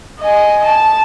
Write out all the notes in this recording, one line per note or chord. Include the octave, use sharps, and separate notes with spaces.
D#5 G#5
A5